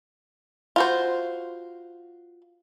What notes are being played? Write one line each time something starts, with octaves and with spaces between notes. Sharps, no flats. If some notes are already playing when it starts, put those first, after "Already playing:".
F4 F#4 C5